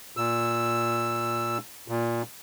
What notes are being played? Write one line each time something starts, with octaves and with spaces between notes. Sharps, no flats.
A#2 E6
A#2